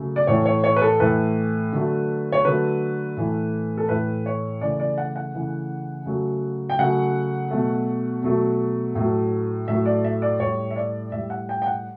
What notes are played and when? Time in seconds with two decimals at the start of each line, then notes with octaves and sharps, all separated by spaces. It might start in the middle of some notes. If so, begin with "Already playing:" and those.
Already playing: C#3 F#3 A3
0.16 D5
0.27 A2 E3 A3 C#5
0.46 C#5
0.64 C#5
0.76 B4
0.81 A4
1.00 A2 E3 A3 B4
1.73 D3 F#3 A3
2.32 C#5
2.45 D3 F#3 A3 B4
3.17 A2 E3 A3
3.77 A4
3.89 A2 E3 A3 B4
4.26 C#5
4.61 C#3 E3 A3 D5
4.80 D5
4.98 F#5
5.16 F#5
5.34 C#3 E3 A3
6.06 C#3 F#3 A3
6.70 G5
6.79 C#3 F#3 A3 F#5
7.51 B2 F#3 A3
8.23 B2 F#3 A3
8.95 A2 F#3 A3
9.68 A2 F#3 A3 E5
9.86 D5
10.05 E5
10.22 D5
10.40 A2 G3 C#5
10.71 E5
10.76 D5
11.12 A2 G3 E5
11.30 F#5
11.49 G5
11.62 G5
11.66 F#5